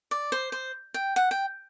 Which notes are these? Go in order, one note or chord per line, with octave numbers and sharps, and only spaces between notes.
D5
C5
C5
G5
F#5
G5